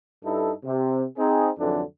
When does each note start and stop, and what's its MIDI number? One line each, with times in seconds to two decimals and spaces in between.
0.25 0.52 43
0.25 0.52 63
0.25 0.52 64
0.25 0.52 69
0.65 1.04 48
1.18 1.50 60
1.18 1.50 63
1.18 1.50 68
1.59 1.82 41
1.59 1.82 44
1.59 1.82 50
1.59 1.82 52
1.59 1.82 54
1.59 1.82 62